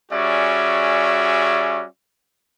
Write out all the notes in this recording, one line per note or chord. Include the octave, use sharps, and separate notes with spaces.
G3 C#4 F#4 G#4 D5 E5